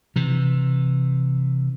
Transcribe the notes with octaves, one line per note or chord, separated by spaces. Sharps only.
C3 E3